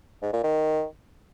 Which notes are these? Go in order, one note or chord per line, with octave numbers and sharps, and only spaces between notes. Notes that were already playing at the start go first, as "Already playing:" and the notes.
G#2
A#2
D#3